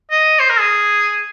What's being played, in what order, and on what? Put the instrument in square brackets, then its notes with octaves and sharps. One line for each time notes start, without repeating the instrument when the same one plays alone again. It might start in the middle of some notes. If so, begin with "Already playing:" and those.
[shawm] D#5
C5
A#4
G#4